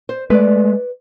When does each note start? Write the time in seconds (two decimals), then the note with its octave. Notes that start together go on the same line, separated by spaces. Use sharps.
0.09 C5
0.30 G#3 A3 B4 D5